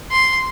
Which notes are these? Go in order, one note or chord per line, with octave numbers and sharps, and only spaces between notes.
C6